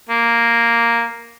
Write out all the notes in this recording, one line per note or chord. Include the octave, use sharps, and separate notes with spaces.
A#3